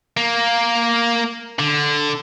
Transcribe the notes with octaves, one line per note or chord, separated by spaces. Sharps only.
A#3
D3